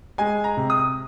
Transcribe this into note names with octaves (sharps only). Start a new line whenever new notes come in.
G#3 G#5
A#5
C3
D#6